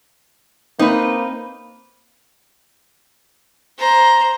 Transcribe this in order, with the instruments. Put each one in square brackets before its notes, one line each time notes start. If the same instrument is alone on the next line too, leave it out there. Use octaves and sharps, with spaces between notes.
[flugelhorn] A#3 [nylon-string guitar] C4 [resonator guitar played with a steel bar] D#4 B4
[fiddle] C5 A#5